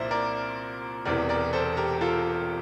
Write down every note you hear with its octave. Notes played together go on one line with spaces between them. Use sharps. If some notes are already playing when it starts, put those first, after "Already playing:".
Already playing: C2 A#2 F3 A#4 C5 D5 E5
A#4 D5
E1 E2 C3 E3 A#4 D5
A#4 D5
A4 C5
G4 A#4
F4 A4